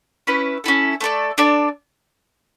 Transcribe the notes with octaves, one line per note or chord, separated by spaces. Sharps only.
C#4 E4 B4
C#4 E4 A4
A3 D4 A4 D5
D4 A4 D5